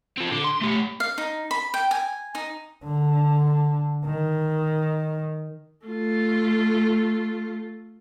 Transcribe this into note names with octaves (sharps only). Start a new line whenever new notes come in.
C4 F4
D3
C6
A3 G4
F5
D#4
B5
G5
G#5
D#4
D3
D#3
A3 F4